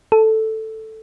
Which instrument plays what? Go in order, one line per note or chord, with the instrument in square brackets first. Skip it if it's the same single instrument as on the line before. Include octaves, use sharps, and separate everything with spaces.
[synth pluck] A4